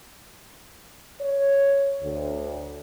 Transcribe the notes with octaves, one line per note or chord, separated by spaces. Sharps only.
C#5
D2